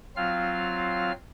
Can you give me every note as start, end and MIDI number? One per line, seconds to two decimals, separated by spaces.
0.16 1.12 54
0.16 1.12 60
0.16 1.12 65
0.16 1.12 77
0.16 1.12 89